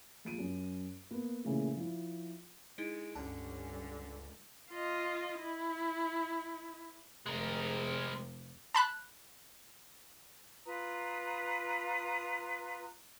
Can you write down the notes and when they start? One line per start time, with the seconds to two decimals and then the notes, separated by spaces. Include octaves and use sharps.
0.25 A#1 F4 D7 D#7
0.38 F#2
1.11 A#3 B3
1.44 A#2 C#3 E3 A3 A#3
1.77 F3 E4
2.78 G#3 D#4 E4 D7
3.15 C#2 G2 D3 G3 C#4 A5
4.70 F4 D#5
5.40 E4
7.26 F1 C3 G#3 A#4
8.74 A5 B5 F#6
10.65 F4 B4 A#5 D#6